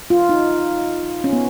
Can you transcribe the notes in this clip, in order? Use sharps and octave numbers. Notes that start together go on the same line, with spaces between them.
F4
D#4
C#4
B3